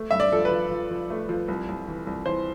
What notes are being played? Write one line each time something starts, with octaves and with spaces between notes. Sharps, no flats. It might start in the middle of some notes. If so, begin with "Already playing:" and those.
Already playing: A3
G2 E5
D5
F3 A4
B4
F3
F3
F3
A3
F3
C2
C2
E3
C2
E3 C5